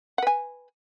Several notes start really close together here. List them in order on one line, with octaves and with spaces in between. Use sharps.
F#5 B4 G#5